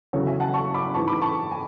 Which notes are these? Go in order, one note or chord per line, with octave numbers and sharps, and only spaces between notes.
E2 C#3 F#3 A4 C#5
E5 G#5
F#5 A5
A5 C#6
B5 D6
G#2 E3 G#3 A5 C#6
B5 D6
A5 C#6
G#5